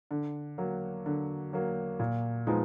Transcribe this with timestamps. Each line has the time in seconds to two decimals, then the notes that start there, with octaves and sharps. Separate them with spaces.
0.11 D3
0.58 F#3 A#3
1.06 D3
1.53 F#3 A#3
1.99 A#2
2.47 F3 G#3 B3 D#4